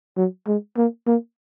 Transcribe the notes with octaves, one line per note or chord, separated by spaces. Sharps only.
F#3
G#3
A#3
A#3